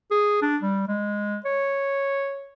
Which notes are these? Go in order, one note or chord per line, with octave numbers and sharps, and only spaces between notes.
G#4
D4
G3
G#3
C#5